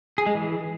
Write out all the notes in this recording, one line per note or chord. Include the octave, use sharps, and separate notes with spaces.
G#4
G#3
E3